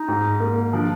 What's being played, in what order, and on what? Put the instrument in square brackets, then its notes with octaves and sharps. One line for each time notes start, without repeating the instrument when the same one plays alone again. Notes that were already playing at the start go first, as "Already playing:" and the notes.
Already playing: [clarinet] D#4
[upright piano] G#2
A#3
[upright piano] F3 [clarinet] D4